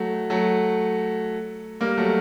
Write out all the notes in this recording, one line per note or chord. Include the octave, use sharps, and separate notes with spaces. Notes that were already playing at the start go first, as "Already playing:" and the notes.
Already playing: F#3 A3
F#3 A3
G3 A#3
F#3 A3